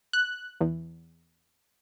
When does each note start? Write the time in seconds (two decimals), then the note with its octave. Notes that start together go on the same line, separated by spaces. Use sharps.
0.13 F#6
0.61 E2